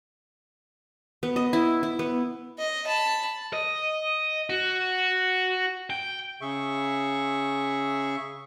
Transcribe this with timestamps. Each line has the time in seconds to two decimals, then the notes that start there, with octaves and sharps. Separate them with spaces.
1.23 B3
1.36 D#5
1.53 E4
1.83 E4
1.99 B3
2.59 D#5
2.87 A5 B5
3.53 D#5
4.50 F#4
5.90 G5
6.41 C#3 G#4 E5 C#6